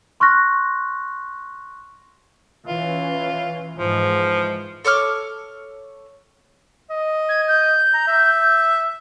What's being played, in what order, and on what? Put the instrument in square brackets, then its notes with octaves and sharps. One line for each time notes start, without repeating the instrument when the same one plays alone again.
[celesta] C6 C#6 F6 F#6 A#6
[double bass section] E3 C#4 [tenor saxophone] F4
[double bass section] G#2 E3 G#3 [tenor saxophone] F3
[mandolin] A4 C#5 D6 F6
[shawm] D#5
[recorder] G#6
G6
[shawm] A#5
E5